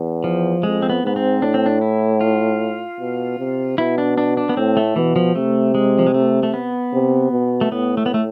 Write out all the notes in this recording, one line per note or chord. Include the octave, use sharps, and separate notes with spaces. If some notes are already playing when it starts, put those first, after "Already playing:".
Already playing: E2
F3
F2 G#3
C4
B3
G#2 B3
C4
A2 D4
C4
D4
E4
F4
B2
C3
B2 E4
D4
D4
D4
B3
A2 C4
A3
B2 E3
F3
C3 A3
G#3
F3
G#3
A3
A3
B3
C3
B2
A3
A2 B3
A3
B3
A3